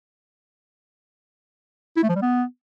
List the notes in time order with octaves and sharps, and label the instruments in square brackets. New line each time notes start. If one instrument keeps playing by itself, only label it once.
[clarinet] E4
A3
F3
G3
B3